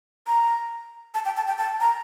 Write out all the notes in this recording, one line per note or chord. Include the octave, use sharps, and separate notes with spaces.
A#5
A5
G5
A5
G5
A5
A#5